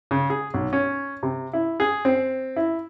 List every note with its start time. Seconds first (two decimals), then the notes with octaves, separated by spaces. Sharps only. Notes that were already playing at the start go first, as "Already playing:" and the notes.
0.11 C#3
0.30 G#4
0.54 B1
0.73 C#4
1.23 C3
1.53 E4
1.80 G#4
2.05 C4
2.56 E4